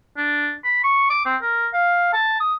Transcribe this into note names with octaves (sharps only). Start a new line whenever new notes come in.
D4
B5
C#6
D6
C4
A#4
F5
A5
D#6